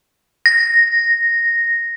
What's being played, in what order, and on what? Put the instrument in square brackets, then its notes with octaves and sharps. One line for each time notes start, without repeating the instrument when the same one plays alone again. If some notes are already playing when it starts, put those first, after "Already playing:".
[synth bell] A#6